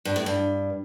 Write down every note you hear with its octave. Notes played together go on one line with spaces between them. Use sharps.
G2
A2
G2